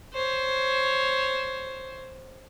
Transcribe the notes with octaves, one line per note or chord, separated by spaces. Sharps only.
C5 C#5